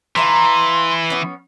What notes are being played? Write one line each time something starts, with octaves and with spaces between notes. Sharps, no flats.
E3 F5 A5 A#5 C6
B3 C#4